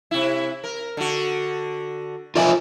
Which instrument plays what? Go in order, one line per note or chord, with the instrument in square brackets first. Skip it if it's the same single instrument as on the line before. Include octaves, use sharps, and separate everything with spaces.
[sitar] C3 E4
A#4
D3 F#4
[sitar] F2 A#3 D5 [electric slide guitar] F4 E5 G#5